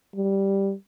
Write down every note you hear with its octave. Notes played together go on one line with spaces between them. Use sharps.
G3